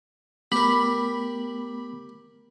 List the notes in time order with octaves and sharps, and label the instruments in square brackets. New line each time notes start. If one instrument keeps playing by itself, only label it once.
[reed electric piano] A3 B3 [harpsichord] G4 A#4 [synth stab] B5